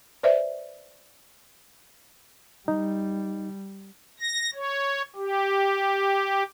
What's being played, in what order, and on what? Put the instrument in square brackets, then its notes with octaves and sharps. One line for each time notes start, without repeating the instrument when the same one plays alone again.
[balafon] B4 C5 D5 E5
[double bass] G3 [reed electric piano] D#4
[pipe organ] A#6
C#5
G4